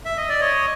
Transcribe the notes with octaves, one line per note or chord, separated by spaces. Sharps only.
E5
D#5
D5
C#5 D#5